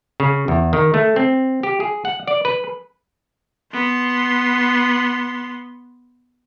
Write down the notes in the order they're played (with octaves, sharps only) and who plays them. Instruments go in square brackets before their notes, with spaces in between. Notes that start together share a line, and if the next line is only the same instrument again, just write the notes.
[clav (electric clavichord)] C#3
E2
D#3
A3
C4
G4
G#4
F#5
D5
B4
[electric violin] B3 C6